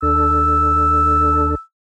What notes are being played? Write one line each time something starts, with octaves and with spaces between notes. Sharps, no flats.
D#2 D4 A4 E6